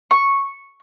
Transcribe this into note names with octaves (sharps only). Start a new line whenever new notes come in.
C#6